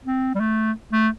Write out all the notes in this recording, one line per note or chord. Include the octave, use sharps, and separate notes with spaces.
C4
G3
A3
A3